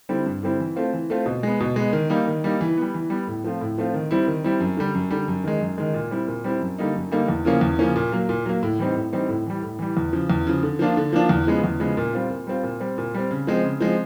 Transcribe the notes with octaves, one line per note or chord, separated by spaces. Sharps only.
D3 G3 C4 E4
G2
D3 G3 C4 E4
E3
A3 C4 F4
E3
A3 C4 F4
B2
G#3 B3
B2
G#3 B3
D#3
G3 A#3 D#4
D#3
G3 A#3 D#4
E3
G3 B3
E3
G3 B3
A2
F3 A3 C4 F4
A2
F3 A3 C4 F4
D#3
G3 C4 E4
D#3
G3 C4 E4
F#2
D3 G3
F#2
D3 G3
F#2
D#3 G#3
F#2
D#3 G#3
A#2
G3 C4 E4
A#2
G3 C4 E4
F#2
D3 G3 A#3 D#4
F#2
D3 G3 A#3 D#4
E2
C#3 F3 A#3 C#4
E2
C#3 F3 A#3 C#4
A#2
F#3 A#3
A#2
F#3 A#3
A2
E3 G3 C4 D#4
A2
E3 G3 C4 D#4
A2
E3 G3
A2
E3 G3
E2
C#3 F3
E2
C#3 F3
D3
F3 A#3 D4 F4
D3
F3 A#3 D4 F4
E2
C#3 F3 G#3 B3
E2
C#3 F3 G#3 B3
A#2
G3 C4 F4
A#2
G3 C4 F4
A#2
G3 C4
A#2
G3 C4
C#3
F3 G#3 C4
C#3
F3 G#3 C4